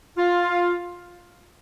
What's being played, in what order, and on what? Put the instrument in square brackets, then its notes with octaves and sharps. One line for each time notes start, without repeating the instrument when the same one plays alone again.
[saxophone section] F4